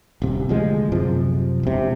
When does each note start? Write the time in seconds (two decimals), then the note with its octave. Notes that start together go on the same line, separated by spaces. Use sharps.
0.22 D#1 C3
0.49 D2 F3 G#3
0.92 F#2 C3 F3
1.63 E1 C3